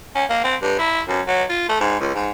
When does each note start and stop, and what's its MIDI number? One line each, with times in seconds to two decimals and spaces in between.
0.15 0.24 61
0.29 0.39 58
0.44 0.55 60
0.62 0.75 43
0.78 1.01 64
1.08 1.21 42
1.27 1.43 54
1.49 1.66 65
1.68 1.80 57
1.80 1.99 44
2.00 2.15 37
2.15 2.30 44